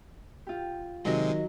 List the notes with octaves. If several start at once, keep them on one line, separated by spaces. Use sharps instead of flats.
F4 G4
C3 D#3 F#3 G#3 D#5